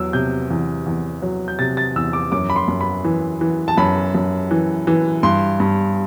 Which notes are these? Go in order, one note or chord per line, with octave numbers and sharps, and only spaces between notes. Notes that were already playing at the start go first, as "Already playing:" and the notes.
Already playing: E2 F#3 E6
C3 G6
E2
E2
F#3
G6
C3 A6
A6
E2 E6
D6
F#2 D6
B5
C6
F#2
B5
E3
E3
A5
F#2 B5
F#2
E3
E3
G2 C6
G2